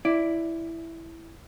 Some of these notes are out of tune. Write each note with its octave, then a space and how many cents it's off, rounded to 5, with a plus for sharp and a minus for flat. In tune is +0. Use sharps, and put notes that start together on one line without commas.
E4 +0 D5 +0